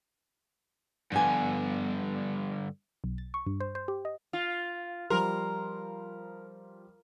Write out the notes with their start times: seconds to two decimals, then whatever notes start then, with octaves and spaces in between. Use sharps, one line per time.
1.12 G2 D3 F3 B3 G#5
3.04 B1
3.18 A6
3.34 C#6
3.46 G2
3.60 C5
3.75 C5
3.88 G4
4.05 D#5
4.33 F4
5.10 F3 G3 A#4 C6